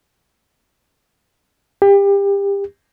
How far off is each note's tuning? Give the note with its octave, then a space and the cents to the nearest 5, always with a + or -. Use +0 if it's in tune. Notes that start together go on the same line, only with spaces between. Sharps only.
G4 +30